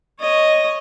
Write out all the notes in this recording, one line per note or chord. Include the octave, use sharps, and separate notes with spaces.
C#5 D#5